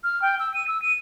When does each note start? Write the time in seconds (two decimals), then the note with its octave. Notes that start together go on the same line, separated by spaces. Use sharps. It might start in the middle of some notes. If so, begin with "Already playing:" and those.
0.04 F6
0.22 G5
0.39 E6
0.54 D#7
0.68 E6
0.82 D#7